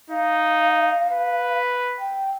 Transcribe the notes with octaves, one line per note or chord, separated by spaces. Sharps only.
D#4 F5
B4
G5